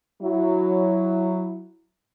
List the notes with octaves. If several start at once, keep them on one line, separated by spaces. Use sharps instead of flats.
F#3 E4